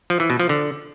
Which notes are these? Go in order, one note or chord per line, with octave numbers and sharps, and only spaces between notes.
F3
E3
B2
F3
D3